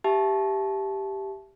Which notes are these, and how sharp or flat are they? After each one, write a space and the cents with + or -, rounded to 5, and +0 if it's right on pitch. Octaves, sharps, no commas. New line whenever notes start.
G4 +0 E5 +15 A5 -20